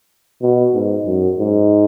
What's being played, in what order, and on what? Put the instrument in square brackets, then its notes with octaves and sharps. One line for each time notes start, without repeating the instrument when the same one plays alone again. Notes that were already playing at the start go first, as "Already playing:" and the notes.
[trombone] B2
G#2
F#2
G#2